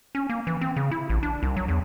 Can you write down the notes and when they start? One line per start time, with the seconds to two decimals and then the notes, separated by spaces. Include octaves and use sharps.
0.15 C#4
0.30 A#3
0.47 E3
0.61 C4
0.76 C#3
0.91 E4
1.10 A1
1.23 D4
1.43 C2
1.57 F#3
1.68 E2